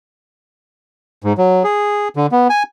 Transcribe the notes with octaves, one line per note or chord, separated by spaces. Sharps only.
G#2
F#3
G#4
D3
B3
G#5